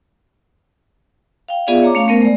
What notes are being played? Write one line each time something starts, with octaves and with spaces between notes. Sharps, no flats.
F5 G5
B3 F4 G#4 D5 E5 F5
C#5 A#5 D6
A3 C#4 F5
A3 B3 A#4 C5
G#3 D5